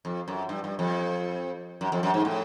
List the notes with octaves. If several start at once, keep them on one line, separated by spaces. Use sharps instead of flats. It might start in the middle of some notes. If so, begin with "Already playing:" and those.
F2
F#2
G2
G2
F2
F#2
F2
F#2
G#2
A2